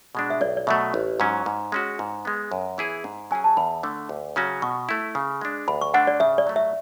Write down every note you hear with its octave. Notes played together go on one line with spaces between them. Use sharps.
B2 G#3 D4
E5
B1 D5
D5
B2 F#3 A3 E5
A1
G#2 F#3 C#4
G#2
G#3 C#4 F#4
G#2
G#3 B3
F#2
E3 B3 E4 G#4
G#2
F#3 C#4 G#4 G#5
A5
E2 B5
D3 A3
D2
C#3 F#3 C#4 F#4
B2 C#6
A3 E4
C#3
G#3 D4
D2 B5
C#6
D3 A3 D4 F#5
D5
C#3 E5
D5
F#3 A3
E5